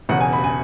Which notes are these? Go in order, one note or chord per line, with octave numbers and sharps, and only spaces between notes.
E1 E2 C#3 F#5
G#5
B5
G#5